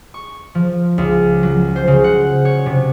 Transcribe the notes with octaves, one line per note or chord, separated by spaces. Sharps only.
C#6
F3
C#2
F#3
C5
C#3
F#5
C#5
C3